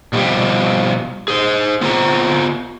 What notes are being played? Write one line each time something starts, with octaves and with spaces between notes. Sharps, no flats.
B2 F3 G3 G4
G#4 C5
B3 F4 C5 A#5